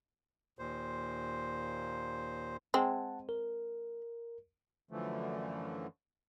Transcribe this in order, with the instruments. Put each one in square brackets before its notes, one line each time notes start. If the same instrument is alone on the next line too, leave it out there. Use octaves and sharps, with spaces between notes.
[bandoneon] D#2 A#2 C5
[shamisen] G#3 C4 [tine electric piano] F#5 A5
[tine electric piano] A#4
[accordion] F#2 D3 E3 F3 A3